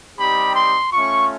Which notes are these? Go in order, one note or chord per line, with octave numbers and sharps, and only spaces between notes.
G3 C4 D#4 G4 B5
C6
A3 C#4 F4 C#6